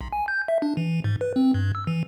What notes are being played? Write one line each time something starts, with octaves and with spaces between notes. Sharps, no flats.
B1
G#5
G6
E5
D4
E3
G#2
B4
C4
G2
E6
E3